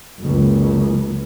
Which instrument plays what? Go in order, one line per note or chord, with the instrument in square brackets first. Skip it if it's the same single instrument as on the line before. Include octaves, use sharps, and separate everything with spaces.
[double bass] F#1 C#2